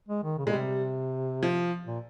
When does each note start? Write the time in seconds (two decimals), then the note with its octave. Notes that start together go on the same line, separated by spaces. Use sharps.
0.09 G#3
0.24 D#3
0.38 C#3
0.45 A#2 G#3
0.53 C3 G3
1.43 F3
1.87 A#2